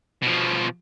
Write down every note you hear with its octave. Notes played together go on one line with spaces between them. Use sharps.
B2 F3